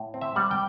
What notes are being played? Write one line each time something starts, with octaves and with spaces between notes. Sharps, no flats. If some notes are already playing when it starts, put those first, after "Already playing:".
Already playing: A2
C4
E5
G3 F#5
G5